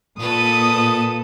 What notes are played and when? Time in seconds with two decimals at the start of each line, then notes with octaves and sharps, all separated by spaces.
0.19 A#2 A4 B4 D#6